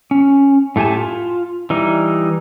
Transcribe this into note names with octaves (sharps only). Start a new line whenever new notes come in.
C#4
A2 A3 G4 G#5 A5
F4
E3 G3 D#4